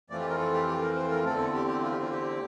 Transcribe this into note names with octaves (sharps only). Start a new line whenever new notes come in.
F2 E3 A3 C4 F4 D5
G4
A#4
A4
G4
G4
A#4
C5
A#4
E2 D3 A3 C4 A4
G4
G4
F4
G4
F4
G4